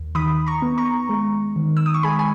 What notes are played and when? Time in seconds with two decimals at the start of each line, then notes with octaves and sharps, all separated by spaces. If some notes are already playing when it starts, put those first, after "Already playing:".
Already playing: D#2
0.15 D#3 B5 D#6
0.47 A#5 C#6
0.62 B3
0.78 A#5 C#6
1.09 G#3
1.56 D#3
1.77 E6
1.86 D#6
1.94 C#6
2.03 G#3 G#5 B5
2.19 G#5